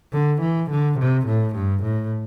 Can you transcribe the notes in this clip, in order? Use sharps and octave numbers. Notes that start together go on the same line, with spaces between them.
D3
E3
D3
C3
A2
G2
A2